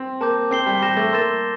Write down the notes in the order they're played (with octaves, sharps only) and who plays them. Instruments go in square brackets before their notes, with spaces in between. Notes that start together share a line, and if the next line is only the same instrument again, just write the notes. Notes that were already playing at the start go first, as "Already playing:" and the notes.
Already playing: [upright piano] C4
[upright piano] A#3 [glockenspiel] A5 D6 G6
[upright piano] C4 [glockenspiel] G6 C7 G7
[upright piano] G3
[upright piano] G3 [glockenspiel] G6 A#6 E7
[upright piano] A3
[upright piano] A#3 [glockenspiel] C6 E6 A6 E7